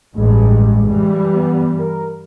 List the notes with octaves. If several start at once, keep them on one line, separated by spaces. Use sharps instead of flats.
A1 G2 G#3
G2 E3 G3
B3
A#4